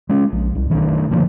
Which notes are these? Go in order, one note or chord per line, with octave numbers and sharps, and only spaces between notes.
G#3 C#4
A#1
C2
B2 D#3 A3 D4
F#1 D3 F3 A#3